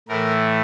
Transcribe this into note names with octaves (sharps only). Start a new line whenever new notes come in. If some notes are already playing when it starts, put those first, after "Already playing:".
A2 E3 A3 A#4